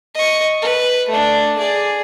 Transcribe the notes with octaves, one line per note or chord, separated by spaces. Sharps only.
D#5 C#6
B4
A3 D4
G#4 D5